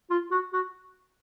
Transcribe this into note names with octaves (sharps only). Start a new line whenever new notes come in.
F4
F#4
F#4